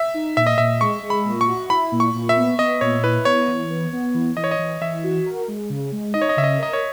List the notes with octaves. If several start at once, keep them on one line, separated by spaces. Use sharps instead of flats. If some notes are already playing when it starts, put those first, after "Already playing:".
Already playing: E5
D#4
A#2 E5
D#5
A#2 E5
G#3 C#6
G#3
B5
A#2
C#6
F#4
E4 B5
A#2
C#6
A#2
E5
B3
B3 D#5
A#2 C#5
E4 B4
B3 C#5
E3
B3
B3
E3
E3 D#5
C#5
D#5
E3
E3 E5
F#4
A#4
G#3
C#3
G#3
D#4 D#5
C#5
D#5
C#3 E5
D#5
A#4 D#5
C#5